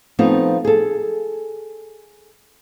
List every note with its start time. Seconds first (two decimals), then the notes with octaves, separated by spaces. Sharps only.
0.19 F3 A3 B3 C4 D#4 F4
0.65 G#4 A4